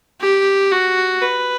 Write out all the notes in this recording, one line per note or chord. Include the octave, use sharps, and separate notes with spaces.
G4
F#4
B4